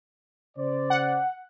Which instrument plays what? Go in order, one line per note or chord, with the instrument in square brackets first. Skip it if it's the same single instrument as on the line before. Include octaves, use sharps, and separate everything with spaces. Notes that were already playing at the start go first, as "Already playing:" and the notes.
[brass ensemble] C#3 C5 D5
[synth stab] F#5